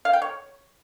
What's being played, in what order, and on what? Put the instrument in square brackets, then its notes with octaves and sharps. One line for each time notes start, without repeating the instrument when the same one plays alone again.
[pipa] F5
G5
C#5